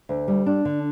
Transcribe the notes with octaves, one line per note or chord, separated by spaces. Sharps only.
D2
G3
D4
D3